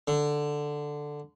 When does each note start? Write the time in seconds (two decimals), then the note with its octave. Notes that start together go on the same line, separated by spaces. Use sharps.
0.07 D3